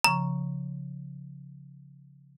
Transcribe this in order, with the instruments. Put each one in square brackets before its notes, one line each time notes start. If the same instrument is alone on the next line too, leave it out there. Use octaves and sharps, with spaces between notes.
[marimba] C#3 F3 C#6 [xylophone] A#5